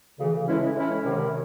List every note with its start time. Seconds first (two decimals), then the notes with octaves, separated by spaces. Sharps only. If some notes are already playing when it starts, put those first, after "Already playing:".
0.19 D2 C#3 E3
0.47 A2 E3 G#3 C#4 E4
0.76 A2 E3 G#3 C#4 E4
1.05 C2 C3 D#3